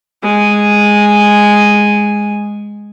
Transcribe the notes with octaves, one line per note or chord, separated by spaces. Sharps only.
G#3 G#5